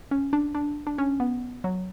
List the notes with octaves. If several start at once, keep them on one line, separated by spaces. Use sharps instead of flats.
C#4
D4
D4
D4
C#4
B3
F#3